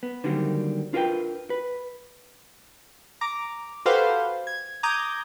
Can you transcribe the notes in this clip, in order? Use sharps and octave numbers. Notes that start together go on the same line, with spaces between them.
B3
D3 D#3 F#3 G3 A#3 C4
D4 F4 A#4 B4 E5 G5
B4
A#5 D6
F#4 G4 A4 B4 C5 F5
G#6
A#5 D6 D#6 G6 G#6